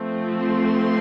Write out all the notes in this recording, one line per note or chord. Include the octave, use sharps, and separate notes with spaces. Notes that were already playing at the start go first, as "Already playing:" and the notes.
Already playing: F3 A3 C4
C6